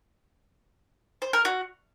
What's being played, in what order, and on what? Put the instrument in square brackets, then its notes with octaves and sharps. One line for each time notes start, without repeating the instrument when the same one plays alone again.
[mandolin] C5
A#4
F#4